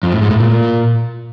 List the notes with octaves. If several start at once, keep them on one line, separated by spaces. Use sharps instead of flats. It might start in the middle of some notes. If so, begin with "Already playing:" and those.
F2
A2
G#2
A2
A#2